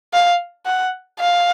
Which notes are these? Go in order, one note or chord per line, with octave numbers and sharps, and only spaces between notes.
F5
F#5
F5